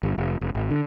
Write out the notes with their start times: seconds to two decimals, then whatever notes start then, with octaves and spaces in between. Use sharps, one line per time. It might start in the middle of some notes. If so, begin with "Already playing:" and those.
0.03 G1
0.18 F1
0.41 F1
0.55 G#1
0.71 D3